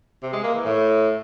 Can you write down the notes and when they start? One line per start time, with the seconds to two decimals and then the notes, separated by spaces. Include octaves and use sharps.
0.22 C3
0.33 G#3
0.44 A#3
0.54 E3
0.65 A2